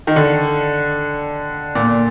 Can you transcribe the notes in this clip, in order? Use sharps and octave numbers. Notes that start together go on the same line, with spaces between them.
D#3
D3
A#2